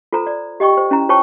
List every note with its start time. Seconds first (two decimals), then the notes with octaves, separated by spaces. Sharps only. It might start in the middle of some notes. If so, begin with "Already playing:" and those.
0.13 F4 A4 C5 A#5
0.27 D5
0.60 G4 D#5 G5 C#6
0.77 C5
0.91 C#4 E4 A#5
1.09 F4 C5 C#5 G5 A5 C#6